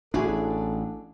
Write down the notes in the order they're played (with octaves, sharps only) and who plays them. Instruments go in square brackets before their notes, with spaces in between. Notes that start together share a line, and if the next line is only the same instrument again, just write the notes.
[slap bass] A1 D4 [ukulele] E4 F#4 G#4 [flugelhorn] A4